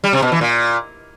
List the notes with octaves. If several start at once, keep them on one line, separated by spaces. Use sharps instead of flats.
G3
C3
B2
E3
A#2